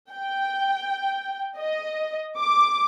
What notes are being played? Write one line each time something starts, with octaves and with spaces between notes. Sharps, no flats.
G5
D#5
D6